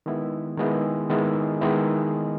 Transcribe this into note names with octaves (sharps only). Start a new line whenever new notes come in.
D#3 G#3 B3 E4
D#3 G#3 B3 E4
D#3 G#3 B3 E4
D#3 G#3 B3 E4